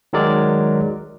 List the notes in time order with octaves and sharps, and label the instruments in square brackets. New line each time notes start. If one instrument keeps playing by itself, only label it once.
[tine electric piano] D#3 F#3 G#3 A#4 D5